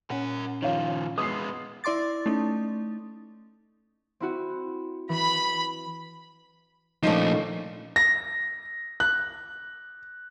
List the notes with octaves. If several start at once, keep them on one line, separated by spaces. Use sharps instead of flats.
A#2 C#4 A#4 F#5
D#3 F3 C#5 F5
G#3 B3 B4 C6 D#6 E6 C7
E4 D5 C6 D6 A6
A3 C#4 D#4
C4 E4 F#4
E3 B5
A#2 F3 A3 C#4 D#4
A#6
F#6